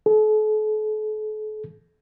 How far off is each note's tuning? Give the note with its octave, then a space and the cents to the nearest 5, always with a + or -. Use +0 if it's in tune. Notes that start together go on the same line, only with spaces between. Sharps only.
A4 -45